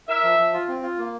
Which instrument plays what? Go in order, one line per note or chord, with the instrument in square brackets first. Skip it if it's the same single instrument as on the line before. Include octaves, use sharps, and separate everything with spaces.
[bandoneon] A#4 [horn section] E5
[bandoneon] F3
F3
F4
C4
F4
A#3